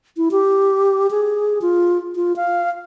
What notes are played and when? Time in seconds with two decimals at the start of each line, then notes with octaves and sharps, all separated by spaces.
0.17 E4
0.31 G4
1.11 G#4
1.62 F4
2.15 F4
2.36 F5